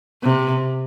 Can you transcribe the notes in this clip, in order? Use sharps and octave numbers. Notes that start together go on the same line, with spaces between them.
C3